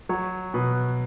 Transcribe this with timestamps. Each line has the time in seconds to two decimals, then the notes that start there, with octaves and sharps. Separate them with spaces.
0.09 F#3 C#5
0.54 B2 B4